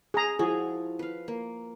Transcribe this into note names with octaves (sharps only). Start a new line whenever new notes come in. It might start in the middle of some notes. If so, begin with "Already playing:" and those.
G#4 A#5
F3 E4 F#4 G#4
B4 F5
A#3